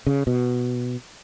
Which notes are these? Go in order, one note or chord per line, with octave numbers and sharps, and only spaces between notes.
C#3
B2